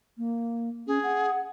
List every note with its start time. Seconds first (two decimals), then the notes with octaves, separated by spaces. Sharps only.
0.18 A#3
0.87 C#4 G#4
1.03 F#5